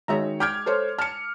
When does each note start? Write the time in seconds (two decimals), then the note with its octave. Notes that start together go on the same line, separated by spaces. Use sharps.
0.08 D#3 G#3 F#4 C#5 E5 A#5
0.40 G5 D6 F6 G#6
0.66 A4 C5 C#5
0.98 A5 F6 C#7